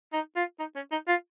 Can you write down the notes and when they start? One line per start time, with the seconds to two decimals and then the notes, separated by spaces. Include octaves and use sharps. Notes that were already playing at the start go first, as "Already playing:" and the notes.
0.13 D#4
0.36 F4
0.59 D#4
0.76 C#4
0.92 D#4
1.08 F4